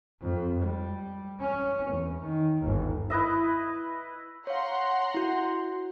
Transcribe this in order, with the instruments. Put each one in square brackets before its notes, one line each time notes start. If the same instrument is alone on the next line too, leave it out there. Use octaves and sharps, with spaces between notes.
[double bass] F2
G3
C#4
E2
D#3
G1 D#2
[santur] E4 B4 D#5 E5
[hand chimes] C#5 F5 [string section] F#5 A#5 C6
[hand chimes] E4 F#4